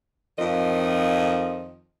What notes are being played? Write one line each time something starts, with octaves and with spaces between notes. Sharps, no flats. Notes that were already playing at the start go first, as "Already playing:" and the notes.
F2 D#3 F3 D#5